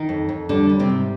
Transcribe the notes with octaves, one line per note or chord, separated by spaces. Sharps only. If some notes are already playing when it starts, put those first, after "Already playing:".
Already playing: D#3 D#4
F2
F2
D3 G3 D4
G3
C3 C4
G#2